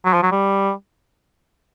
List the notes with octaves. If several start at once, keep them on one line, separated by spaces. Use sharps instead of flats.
F#3
F3
F#3
G3